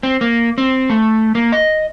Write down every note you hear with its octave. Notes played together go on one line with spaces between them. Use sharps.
C4
A#3
C4
A3
A#3
D#5